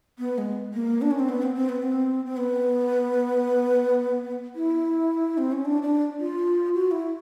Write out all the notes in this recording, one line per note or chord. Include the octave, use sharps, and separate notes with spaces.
B3
G#3
A#3
D4
C#4
C4
B3
C4
C4
B3
C4
C4
B3
E4
C4
C#4
D4
D4
F4
F#4
E4